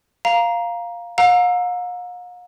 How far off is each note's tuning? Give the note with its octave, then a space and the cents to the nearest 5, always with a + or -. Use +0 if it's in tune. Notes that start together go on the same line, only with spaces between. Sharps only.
F5 +0 A#5 +10
F5 +45 A#5 +0 E6 +10